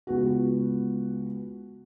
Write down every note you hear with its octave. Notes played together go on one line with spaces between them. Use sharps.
C#2 B3 F#4